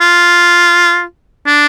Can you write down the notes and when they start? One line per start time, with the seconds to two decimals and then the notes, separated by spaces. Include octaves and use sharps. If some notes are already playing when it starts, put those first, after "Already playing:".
0.01 F4
1.47 D4